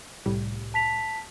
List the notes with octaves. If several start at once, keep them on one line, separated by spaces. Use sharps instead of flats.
C2 A2 G3
A5 B6 F7